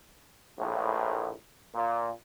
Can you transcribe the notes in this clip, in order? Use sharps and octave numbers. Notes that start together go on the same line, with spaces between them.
A#1 A2
A#2